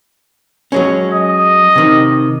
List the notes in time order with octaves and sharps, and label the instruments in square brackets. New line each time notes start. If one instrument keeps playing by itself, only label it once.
[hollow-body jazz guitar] F#3 G#3 C#4
[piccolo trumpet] D#5
[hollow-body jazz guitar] C3 D#3